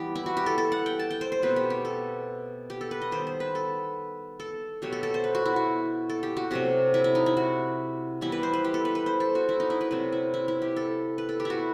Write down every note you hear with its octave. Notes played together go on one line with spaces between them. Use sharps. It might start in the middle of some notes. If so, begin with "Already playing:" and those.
Already playing: E3 G3 B3 G4
E4
F#4
G4
A4
A4
F#5
G5
A5
G5
C5
C5
B2 A3 C4 B4
G4
G4
A4
G4
A4
B4
D#5
D#3 G3 B3 C5
C5
B4
A4
A4
B2 F#3 A3 G4
A4
A4
C5
B4
F#4
E4
F#4
A4
G4
F#4
C3 F#3 A3 G4
E4
E4
D#4
E4
F#4
E3 G3 B3 E4
B4
C5
B4
G4
A4
B4
B4
C5
A4
F#4
E4
D#4
E4
B4
C3 F#3 A3 C4 B4
E4
E4
E4
G4
A4
B4
A4
G4
E4 F#4